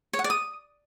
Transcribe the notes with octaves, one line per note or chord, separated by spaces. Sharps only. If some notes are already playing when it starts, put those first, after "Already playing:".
C#5
F#5
D5
D#6